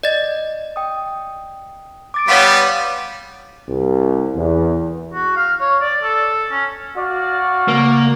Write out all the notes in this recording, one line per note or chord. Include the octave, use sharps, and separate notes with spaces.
D5 D#5 A6
G5 D#6
D6 A6 D7
G3 B3 C#5 F5 F#5 C6 C#6 B6
D6
C2
E2
F#4
F5
C#5
D5
A4
C#4
F#4 D5 F5
C#3 A#3